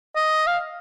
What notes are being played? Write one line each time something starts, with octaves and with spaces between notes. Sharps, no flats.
D#5
F5